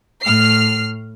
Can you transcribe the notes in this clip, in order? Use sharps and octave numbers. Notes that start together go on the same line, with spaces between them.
A2 F6 C7